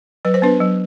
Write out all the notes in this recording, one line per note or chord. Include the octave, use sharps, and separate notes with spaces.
F#3 B4
C5
B3 D4 B4
F#3